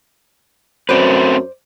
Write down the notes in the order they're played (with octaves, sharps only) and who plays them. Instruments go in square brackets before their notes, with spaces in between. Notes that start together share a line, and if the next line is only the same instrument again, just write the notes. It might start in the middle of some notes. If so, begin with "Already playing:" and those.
[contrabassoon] F#2 [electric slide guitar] A3 C4 B4 [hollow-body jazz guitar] C5 D5